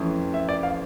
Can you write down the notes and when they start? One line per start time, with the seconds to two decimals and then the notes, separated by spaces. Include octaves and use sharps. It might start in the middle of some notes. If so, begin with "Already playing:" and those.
Already playing: F2 E3 A3 C#4
0.34 E5
0.49 D5
0.63 F5